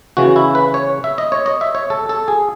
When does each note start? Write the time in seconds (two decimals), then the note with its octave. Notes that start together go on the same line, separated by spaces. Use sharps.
0.17 C#3 E3 F#4
0.36 E4
0.55 B4
0.74 C#5
1.04 E5
1.18 D#5
1.32 C#5
1.46 D#5
1.61 E5
1.75 C#5
1.90 A4
2.09 A4
2.28 G#4